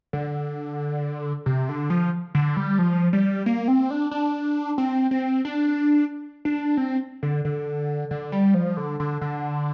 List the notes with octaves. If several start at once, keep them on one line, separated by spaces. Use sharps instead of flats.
D3
C3
D3
F3
D3
G3
F3
G3
A#3
C4
D4
D4
C4
C4
D4
D4
C4
D3
D3
D3
G3
F3
D3
D3
D3